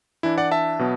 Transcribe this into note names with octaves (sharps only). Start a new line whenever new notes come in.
E3 D4 E4
D5 F#5
E5 A5
B2 F#3 B3